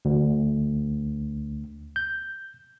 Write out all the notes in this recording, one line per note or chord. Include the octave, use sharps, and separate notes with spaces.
D2
G6